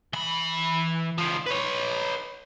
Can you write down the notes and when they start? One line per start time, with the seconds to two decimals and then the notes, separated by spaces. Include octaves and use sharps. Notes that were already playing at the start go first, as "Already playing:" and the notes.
0.13 E3 B5
1.18 C#2 F3
1.46 B4 C#5